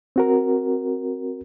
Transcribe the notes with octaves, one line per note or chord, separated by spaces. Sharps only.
C4 F#4 A#4